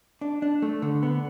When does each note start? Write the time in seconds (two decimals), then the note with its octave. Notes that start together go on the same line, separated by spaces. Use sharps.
0.21 D4
0.42 D4
0.62 A3
0.82 D3
1.03 B3